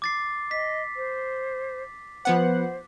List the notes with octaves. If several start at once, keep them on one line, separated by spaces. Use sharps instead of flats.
D6 A6 C7
D#5 B6
C5
F3 B3 C5 F#5